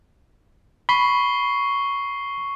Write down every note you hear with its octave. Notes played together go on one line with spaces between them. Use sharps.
B5 C#6 C7 G7